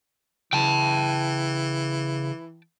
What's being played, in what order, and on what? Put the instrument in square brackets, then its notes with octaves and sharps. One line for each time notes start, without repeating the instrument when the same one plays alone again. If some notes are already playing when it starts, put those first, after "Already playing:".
[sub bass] C#3 [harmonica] E3 [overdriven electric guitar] G5 A5